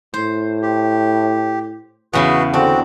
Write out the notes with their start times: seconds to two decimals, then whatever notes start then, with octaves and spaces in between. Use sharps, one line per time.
0.14 A2 C5
0.62 G4
2.13 E2 C#3 B3 F#4 G#4 B4
2.54 D3 C4 D4 F#4